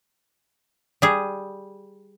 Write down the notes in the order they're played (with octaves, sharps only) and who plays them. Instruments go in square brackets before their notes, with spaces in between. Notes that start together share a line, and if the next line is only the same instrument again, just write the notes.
[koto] G3 G#4